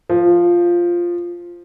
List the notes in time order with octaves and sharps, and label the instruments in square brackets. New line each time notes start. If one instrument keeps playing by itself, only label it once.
[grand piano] F3